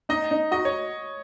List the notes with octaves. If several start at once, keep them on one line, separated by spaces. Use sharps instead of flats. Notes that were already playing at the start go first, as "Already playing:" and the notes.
D#4 D#5
D#4
F#4 D#5
C#5